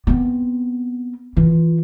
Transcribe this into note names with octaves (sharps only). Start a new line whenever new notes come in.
B3 C4
E3 F4